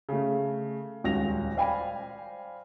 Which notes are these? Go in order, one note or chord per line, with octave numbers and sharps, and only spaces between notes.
C#3 A3
D#1 C#2 F#4 A#6 F7
C5 D5 F5 G5 G#5 B5